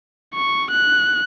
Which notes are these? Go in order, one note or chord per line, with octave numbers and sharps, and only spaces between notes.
C#6
F#6